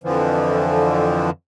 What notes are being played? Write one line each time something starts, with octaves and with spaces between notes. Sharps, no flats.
F2 D3 E3 F3